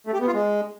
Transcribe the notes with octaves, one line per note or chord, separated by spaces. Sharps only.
A3
G4
B3
F4
G#3